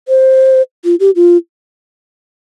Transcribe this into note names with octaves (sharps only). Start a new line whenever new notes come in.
C5
F4
G4
F4